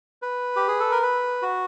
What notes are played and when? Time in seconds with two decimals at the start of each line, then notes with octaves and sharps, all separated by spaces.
0.22 B4
0.56 G4
0.68 G#4
0.80 A4
0.91 A#4
1.02 B4
1.42 F#4